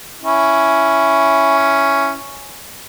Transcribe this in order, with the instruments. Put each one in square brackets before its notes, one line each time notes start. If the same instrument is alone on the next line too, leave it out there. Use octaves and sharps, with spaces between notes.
[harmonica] C#4 E4